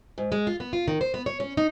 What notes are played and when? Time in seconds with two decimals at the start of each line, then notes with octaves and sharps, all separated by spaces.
0.18 G#2
0.32 G#3
0.47 F4
0.60 B3
0.73 F4
0.88 D#3
1.01 C5
1.14 B3
1.26 C#5
1.40 C#4
1.57 D#4